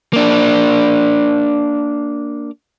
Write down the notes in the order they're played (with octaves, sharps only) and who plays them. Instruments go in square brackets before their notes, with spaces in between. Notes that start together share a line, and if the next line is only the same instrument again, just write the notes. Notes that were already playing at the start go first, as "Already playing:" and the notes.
[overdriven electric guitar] A#3 D4